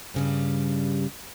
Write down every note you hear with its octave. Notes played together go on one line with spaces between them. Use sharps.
G2 C#3 G3